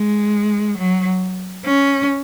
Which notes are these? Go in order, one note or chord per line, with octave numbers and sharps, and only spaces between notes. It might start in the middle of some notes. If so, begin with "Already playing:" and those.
Already playing: G#3
F#3
C#4